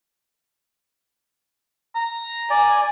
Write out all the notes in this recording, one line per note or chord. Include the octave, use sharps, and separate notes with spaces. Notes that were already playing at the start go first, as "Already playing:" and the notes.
A#5
D5 G#5